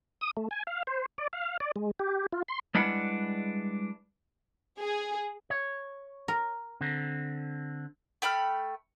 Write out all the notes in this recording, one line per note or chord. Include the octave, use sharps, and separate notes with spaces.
D#6
A3
G#5
F5
C5
D5
F5
D5
G#3
G4
F4
C6
G3 G#3 D4 E4 B4 F#5
G#4
C#5
A#4
D3 C4
A3 G5 B5 F6